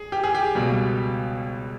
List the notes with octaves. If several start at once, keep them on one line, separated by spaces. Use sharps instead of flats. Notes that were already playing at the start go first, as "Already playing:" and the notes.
Already playing: G#4
G4
G#4
G4
C#2 B2 G3